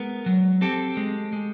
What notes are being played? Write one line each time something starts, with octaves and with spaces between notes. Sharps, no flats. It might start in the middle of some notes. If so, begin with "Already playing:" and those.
Already playing: G#3 B3 A#4
F#3
C4 G4 A4
G#3
G#3